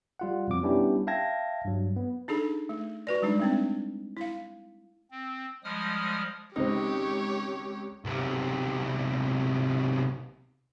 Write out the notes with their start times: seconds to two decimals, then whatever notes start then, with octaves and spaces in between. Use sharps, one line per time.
0.19 G3 F4 F#5
0.47 F2 B2 F3 C4 D6
0.63 G3 B3 C#4 D4 E4 G4
1.07 E5 F5 G5 A5 G#6 A#6
1.65 G2 F#3
1.96 B3
2.28 D4 D#4 G#4 A4
2.69 A3
3.07 F#4 B4 D5
3.22 G3 G#3 D4 D#4
3.40 A3 C4 D4
4.17 E4 F5
5.11 C4
5.64 F3 G3 G#3 D#6 F6
6.56 G#1 C#2 D#4 G4 C5 C#5
8.05 B1 C3